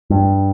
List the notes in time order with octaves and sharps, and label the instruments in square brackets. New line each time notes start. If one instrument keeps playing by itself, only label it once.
[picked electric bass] G2